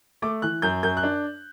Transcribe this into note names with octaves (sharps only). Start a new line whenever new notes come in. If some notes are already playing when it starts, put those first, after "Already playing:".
A3 D6
E3 F#6
F#2 G6
F#2 G6
F#6
D4